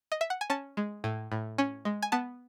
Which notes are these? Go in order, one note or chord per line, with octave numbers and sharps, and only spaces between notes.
D#5
E5
F#5
G#5
C#4 A5
G#3
A2
A2
C#4
G#3
G#5
B3 A5